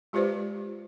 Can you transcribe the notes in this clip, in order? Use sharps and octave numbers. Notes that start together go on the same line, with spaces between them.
G#3 F4 G4 B4 C5 D5